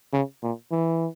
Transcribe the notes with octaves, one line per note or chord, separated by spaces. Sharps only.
C#3
A#2
E3